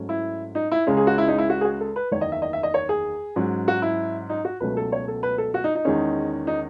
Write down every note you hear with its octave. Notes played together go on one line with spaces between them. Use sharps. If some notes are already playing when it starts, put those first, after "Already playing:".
Already playing: G#2 F#3 A3 C#4
E4
D#4
E4
C#2 C#3 G#3 C#4
G#4
F#4
E4
D#4
E4
F#4
G#4
F#4
A4
B4
F#1 E2 D#3 C#5
D#5
E5
D#5
E5
D#5
C#5
G#4
G#2 F#3 C#4
F#4
E4
D#4
F#4
C#2 B2 F#3 A3 C#4 B4
A4
C#5
A4
B4
A4
F#4
D#4
D#4
E2 D#3 G#3 C#4
D#4